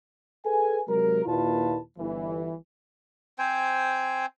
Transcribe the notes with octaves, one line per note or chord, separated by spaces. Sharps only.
G#4 A4 B4 G#5
C3 F#3 G#3 A#4
D#2 A#2 E4 F4 B4 A5
G1 E3
C4 C5 G5 G#5